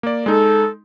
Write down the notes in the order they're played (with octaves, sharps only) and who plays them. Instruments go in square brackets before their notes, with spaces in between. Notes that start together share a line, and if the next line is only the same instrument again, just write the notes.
[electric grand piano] A#3 D5
[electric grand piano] G#3 D#4 [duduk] A4